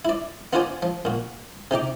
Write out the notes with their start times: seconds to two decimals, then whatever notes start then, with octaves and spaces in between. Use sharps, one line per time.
0.05 E4 D5
0.53 B3 F4 F#4 C5 D5 G#5
0.82 F3
1.05 A#2 F#4
1.71 C3 D#4 G4 D6